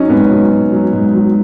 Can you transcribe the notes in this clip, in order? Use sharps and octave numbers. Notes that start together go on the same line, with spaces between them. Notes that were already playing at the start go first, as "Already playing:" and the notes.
Already playing: F#3 C#4 D#4
G#2 B3
F#3
G#2
F#3
G#2
F#3